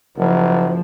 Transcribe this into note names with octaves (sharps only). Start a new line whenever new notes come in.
F#1 F3